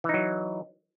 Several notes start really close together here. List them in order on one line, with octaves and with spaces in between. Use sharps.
E3 D#4 F#3